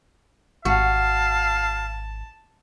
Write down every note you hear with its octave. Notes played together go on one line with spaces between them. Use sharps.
G#1 F#4 F5 A5